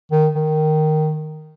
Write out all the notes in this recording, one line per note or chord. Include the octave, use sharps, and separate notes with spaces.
D#3
D#3